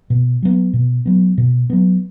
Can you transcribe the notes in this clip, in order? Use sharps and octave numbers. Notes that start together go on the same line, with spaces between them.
B2
F#3 B3
B2
F#3 B3
B2
F#3 B3